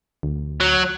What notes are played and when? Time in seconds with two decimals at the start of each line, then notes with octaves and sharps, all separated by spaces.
0.23 D2
0.60 F#3